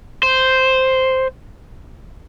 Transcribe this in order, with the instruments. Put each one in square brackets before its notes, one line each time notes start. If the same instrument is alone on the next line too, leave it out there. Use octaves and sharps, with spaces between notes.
[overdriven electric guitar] C5